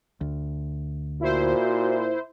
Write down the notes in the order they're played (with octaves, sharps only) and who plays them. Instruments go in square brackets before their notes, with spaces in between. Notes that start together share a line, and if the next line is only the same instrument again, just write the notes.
[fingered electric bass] D2
[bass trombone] A#2 [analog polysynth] E4 C5 [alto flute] F#4